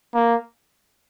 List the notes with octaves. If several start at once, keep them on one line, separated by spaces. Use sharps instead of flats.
A#3